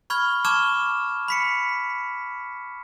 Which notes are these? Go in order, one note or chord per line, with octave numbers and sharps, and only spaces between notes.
B5 C#6 F6 G#6
A5 C#6 D6 F6 G#6 E7
B5 B6 C#7